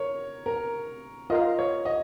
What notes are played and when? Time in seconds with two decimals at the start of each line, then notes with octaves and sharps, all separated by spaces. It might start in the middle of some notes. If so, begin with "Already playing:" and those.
Already playing: A#4 C#5
0.46 A#4
1.30 F4 A#4 D#5 F5
1.59 C#5
1.85 D#5